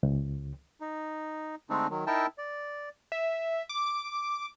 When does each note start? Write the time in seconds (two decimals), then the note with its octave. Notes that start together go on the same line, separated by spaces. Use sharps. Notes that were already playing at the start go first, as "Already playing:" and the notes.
0.03 C#2
0.80 D#4
1.70 D3 G#3 A3 C4 D4 D#4
1.90 D#3 F#3
2.07 D#4 E4 A#4 E5 G5 A5
2.38 D5
3.12 E5
3.69 D6